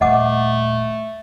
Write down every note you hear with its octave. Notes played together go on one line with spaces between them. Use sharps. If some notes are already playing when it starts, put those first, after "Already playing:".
D#1 A3 D#5 F#5 D6